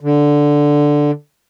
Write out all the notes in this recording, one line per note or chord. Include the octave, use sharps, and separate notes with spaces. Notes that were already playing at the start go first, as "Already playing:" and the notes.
D3